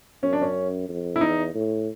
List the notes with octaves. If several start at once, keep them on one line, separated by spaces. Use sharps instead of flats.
F#2 C#4
D4
C#4
F2
E4
E2 D#4
A2